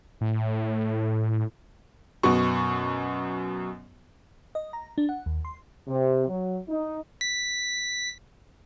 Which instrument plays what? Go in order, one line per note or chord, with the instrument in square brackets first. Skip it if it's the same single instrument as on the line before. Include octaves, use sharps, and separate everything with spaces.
[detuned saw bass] A2
[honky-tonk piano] F#2 B2 F#4 C#6
[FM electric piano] D#5
A#5
D4
F#5
D#2
C6
[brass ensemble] C3
F#3
D#4
[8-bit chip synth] B6